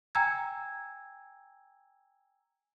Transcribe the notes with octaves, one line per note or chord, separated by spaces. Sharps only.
G5 G#5 A#5 E6 G#6